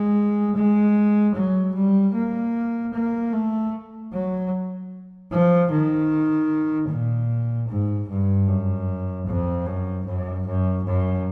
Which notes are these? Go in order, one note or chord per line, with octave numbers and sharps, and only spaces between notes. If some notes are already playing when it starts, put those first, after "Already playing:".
Already playing: G#3
G#3
F#3
G3
A#3
A#3
A3
F#3
F3
D#3
A#2
G#2
G2
F#2
F2
F#2
F#2
F#2
F#2